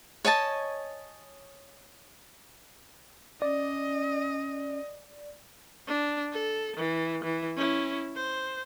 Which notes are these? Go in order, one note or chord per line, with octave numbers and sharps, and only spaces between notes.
C#5 D#5 G#5 A5
C#4 D5 D#5
D4
A4
E3
E3
C#4 E4
C5